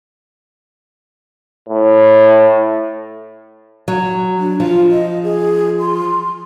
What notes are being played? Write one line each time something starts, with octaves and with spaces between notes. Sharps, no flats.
A2
F#3
D4
F3 F4
D#5
G#4
C6